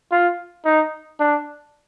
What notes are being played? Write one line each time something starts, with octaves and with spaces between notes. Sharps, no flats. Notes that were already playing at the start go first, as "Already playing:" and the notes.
F4
D#4
D4